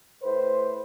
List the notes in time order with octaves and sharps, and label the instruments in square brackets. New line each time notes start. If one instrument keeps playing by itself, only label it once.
[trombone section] A2 B4 C5